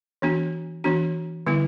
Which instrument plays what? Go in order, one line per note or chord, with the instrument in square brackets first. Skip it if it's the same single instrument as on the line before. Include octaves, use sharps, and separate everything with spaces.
[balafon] E3 B3 D4 F#4
E3 B3 D4 F#4
D3 G3 B3 E4